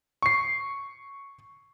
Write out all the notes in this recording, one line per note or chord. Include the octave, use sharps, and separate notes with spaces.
C#6 C7